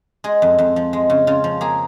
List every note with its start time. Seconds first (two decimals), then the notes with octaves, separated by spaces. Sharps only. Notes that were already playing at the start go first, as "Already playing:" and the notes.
0.24 G#3 G#4
0.42 F2
0.59 F2
0.76 F3
0.93 G#3
1.10 C#3
1.27 C#3 F4
1.44 F3
1.61 A#3 G#4